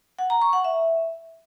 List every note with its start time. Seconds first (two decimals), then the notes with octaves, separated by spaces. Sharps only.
0.19 F#5
0.30 A#5
0.42 C#6
0.53 F#5
0.65 E5